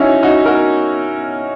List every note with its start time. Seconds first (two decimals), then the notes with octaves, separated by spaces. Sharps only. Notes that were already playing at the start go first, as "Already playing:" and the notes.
Already playing: C#4 D#4 E4 F#4
0.23 D#4 F#4
0.45 F#4 A#4